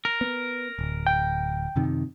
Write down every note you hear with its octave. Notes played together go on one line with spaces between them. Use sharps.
A#4
B3
D1
G5
F#2 C3 D#3